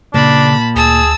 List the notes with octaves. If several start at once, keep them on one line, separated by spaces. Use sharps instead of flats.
A#2 C#3 D4 A5 B5
D2 G#4 A5 E6